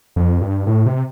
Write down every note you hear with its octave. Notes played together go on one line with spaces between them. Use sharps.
F2
G2
A2
C3